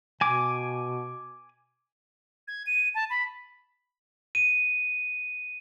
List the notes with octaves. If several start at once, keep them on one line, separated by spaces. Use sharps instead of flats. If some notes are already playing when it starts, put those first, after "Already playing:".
B2 G#5 D6
G#6
D#7
A5
B5
D#7